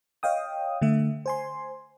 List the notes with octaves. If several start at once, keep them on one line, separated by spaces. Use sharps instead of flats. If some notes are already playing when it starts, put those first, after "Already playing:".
C#5 D#5 F5 G5 D#6
D3 A3 E5
C5 G#5 C6